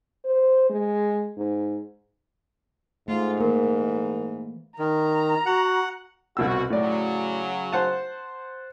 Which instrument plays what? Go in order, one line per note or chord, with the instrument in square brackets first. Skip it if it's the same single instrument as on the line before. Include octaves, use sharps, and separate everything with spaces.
[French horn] C5
G#3
G#2
[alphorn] G#2 [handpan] A3 [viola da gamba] F4
[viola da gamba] E3 [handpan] A#3 [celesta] A#4
[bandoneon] D#3 [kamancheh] A#5
[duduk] F#4 [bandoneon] F#5
[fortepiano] C2 B2 E6 [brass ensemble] F#4
[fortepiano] A2 D5 [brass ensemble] C#3 F#3
[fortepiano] C5 F#5 A5